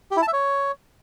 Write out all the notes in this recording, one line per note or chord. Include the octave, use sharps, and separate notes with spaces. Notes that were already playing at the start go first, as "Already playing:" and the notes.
G4
E4
A5
E5
C#5